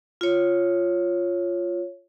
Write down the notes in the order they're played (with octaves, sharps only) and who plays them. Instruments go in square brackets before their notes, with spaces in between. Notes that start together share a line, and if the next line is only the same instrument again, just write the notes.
[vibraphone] F4 C#5